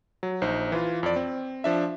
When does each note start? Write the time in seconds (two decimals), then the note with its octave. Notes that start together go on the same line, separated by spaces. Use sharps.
0.23 F#3
0.42 A#1 D#4 C5
0.72 E3 F4
1.03 F2 D5
1.16 C4
1.64 F3 D4 E5